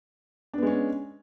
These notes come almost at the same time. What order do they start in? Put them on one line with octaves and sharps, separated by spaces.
D4 B3 G#3 C#4